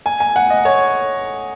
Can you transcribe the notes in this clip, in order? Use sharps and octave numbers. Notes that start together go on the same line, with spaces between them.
G#5
G#5
F#5
D#5
C#5